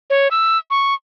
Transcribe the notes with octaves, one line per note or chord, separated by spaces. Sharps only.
C#5
E6
C#6